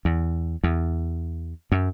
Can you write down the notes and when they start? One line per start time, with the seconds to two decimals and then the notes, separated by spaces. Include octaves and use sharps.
0.05 E2
0.64 E2
1.72 F#2